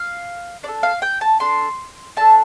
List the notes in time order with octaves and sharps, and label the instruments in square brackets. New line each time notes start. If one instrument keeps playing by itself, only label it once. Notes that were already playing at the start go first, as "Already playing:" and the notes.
Already playing: [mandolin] F5
D4 D5
A4
F5
G5
A5
D4 A4 C6
D4 A4 A5